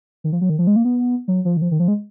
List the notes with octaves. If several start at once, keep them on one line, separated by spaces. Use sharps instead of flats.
D#3
F3
F#3
D#3
F3
G#3
A#3
B3
F#3
F3
D#3
F3
D#3
F3
G#3